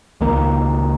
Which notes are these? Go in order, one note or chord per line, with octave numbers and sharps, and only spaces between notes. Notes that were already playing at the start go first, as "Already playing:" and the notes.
C#2 D#3 A#3